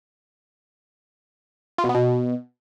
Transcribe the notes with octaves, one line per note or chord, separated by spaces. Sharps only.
F4
B2
B3
B2